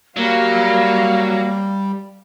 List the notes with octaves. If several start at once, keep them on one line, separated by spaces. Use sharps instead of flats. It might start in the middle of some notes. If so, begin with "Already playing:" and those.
F#3 G3 A#3 F5